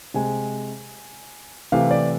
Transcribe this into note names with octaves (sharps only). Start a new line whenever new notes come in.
C3 G#3 G#5
C3 E3 A3 F5
D5